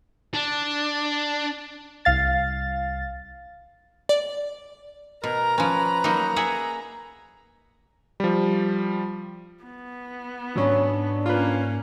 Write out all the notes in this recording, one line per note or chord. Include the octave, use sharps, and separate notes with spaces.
D4
C2 F5 A6
D5
B2 A#4 A#5
F3 C#4 B4
F#3 A#3 D#4
G#4 E5 F#5
F3 G3
B3
G#2 F#3 C#4 D4
A#3 C#4 F4 B4